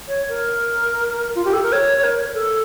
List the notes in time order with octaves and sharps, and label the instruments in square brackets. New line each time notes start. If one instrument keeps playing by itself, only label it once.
[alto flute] C#5
A#4
F4
G4
A4
A#4
C#5
C#5
A#4
A4